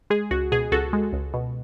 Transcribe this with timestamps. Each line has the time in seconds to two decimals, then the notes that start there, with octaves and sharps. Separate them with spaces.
0.10 G#3 G#4
0.31 C#2 F#4
0.52 B2 G#4
0.72 C#2 F#4 A4
0.93 G#3
1.13 C#2
1.34 B2